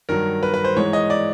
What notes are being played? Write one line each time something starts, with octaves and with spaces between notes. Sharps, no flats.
G2 D#3 F#3 A#4
B4
B4
C5
G#2 E3 G#3 C#5
D#5
D5